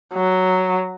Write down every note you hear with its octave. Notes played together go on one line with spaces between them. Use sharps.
F#3